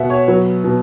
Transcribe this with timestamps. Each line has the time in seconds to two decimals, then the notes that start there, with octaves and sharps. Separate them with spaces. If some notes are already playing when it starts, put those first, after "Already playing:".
Already playing: B2 E5 F#5
0.10 C#5
0.28 F#3 B4
0.64 B2